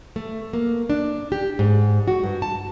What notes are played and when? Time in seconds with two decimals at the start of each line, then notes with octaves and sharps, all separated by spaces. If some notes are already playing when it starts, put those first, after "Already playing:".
0.16 A3
0.53 A#3
0.90 D4
1.32 G4
1.59 G#2
2.08 F#4
2.23 G2
2.42 A5